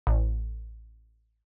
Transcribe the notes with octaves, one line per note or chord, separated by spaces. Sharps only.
A1